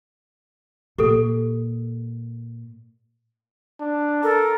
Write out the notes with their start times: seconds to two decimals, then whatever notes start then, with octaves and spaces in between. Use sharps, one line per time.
0.98 A#2 G4 A4
3.80 D4
4.23 A4 A#4